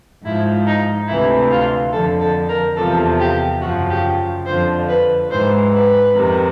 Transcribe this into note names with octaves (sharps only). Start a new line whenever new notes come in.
G#2 F3 E4
D#4
D2 C3 E3 E4
F4
F2 D3 F3 A4
A4
A#4
E2 C3 F3 A4
G4
F#2 C#3 F3 F#4
G4
F2 D3 F3 C5
B4
G#2 E3 C5
B4
F2 C3 D#3